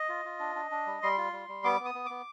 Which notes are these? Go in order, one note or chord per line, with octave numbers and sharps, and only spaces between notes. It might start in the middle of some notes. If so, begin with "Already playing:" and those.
Already playing: D#5
F4
F4
D4
D4
D4
G3
G3 C6
F4
G3
G3
B3 D6
B3
D#6
B3
B3 D6